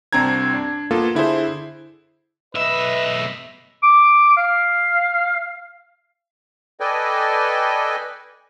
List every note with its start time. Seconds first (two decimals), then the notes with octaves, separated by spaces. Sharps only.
0.13 C2 C4 D4 A#5 G#6
0.54 D4
0.91 A#3 B3 F4 A4
1.15 D3 E4 G#4 C5
2.55 B1 B4 D#5 E5
3.83 D6
4.37 F5
6.80 A4 B4 D5 D#5 G5 G#5